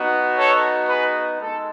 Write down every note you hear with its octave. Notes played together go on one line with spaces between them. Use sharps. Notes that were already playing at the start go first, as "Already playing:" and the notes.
Already playing: B3 D#4 F#4
A4 C#5
G#4 B4
G#3 D#4 A4